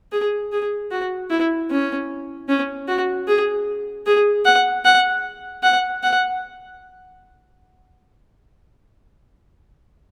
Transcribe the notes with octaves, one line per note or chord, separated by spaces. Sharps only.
G#4
G#4
F#4
E4
C#4
C#4
F#4
G#4
G#4
F#5
F#5
F#5
F#5